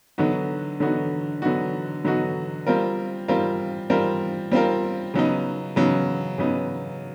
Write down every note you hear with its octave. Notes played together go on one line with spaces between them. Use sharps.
D3 F#3 B3 D#4 F#4
D3 F#3 B3 D#4 F#4
D3 F#3 B3 D#4 F#4
D3 F#3 B3 D#4 F#4
G3 C4 F4 A#4
G3 C4 F4 A#4
G3 C4 F4 A#4
G3 C4 F4 A#4
C#3 F#3 B3 D#4
C#3 F#3 B3 D#4
C#3 F#3 B3 D#4